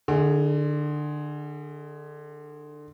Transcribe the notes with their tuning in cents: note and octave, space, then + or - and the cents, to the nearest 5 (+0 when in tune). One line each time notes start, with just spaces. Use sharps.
D3 +25 E4 -35 G#4 +0